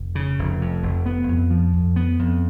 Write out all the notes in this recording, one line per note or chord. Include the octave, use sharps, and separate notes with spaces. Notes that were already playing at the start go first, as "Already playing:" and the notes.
Already playing: F1
C#3
F1
F2
F1
B3
F2
F3
F2
B3
F2